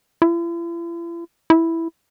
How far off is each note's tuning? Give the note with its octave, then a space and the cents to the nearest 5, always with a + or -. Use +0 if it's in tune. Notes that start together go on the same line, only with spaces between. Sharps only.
E4 +45
E4 +0